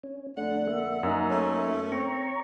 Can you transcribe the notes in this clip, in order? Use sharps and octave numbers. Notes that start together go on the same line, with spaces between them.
C#4
F2 D3 A3 D4 F#5
A#3 E5
F#2 D#4
A3 C#4
C4 C#5 A#5 C#6